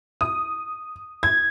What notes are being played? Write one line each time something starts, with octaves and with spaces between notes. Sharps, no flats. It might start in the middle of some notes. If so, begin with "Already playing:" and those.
D#6
G#6